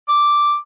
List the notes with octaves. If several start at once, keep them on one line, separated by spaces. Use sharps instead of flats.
D6